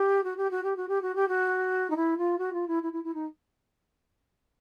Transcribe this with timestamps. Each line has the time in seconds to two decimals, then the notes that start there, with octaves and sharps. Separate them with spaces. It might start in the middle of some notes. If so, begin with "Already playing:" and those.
Already playing: G4
0.24 F#4
0.37 G4
0.51 F#4
0.63 G4
0.76 F#4
0.88 G4
1.02 F#4
1.15 G4
1.28 F#4
1.90 D#4
1.96 E4
2.17 F4
2.38 F#4
2.53 F4
2.67 E4
2.82 E4
2.92 E4
3.04 E4
3.14 D#4